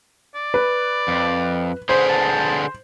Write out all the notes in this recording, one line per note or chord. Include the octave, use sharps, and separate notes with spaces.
D5
B4
F2
D3 G#4 B4 C5
A5